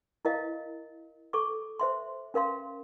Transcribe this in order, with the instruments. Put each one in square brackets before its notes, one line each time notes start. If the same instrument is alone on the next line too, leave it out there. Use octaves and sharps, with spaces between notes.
[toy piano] E4 A#4 D#5 F5
A4 C#6 D6
C5 E5 C6
C#4 A#4 F5 C6